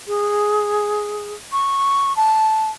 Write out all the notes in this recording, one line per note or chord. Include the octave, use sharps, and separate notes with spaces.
G#4
C#6
A5